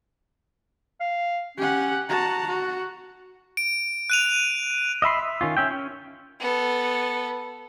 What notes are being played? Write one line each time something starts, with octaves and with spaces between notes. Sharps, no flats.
F5
C#4 G4 F#5
F#4 A5 A#5
F#4
D7
F#6 D#7 F7
D#5 E5 B5 C6
E5
D#3 C#4 F4
C#4 E5 G5
C#4
B3 A4